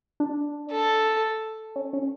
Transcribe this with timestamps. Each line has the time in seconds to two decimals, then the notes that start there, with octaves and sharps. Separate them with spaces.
0.20 D4
0.71 A4
1.76 C#4
1.93 C#4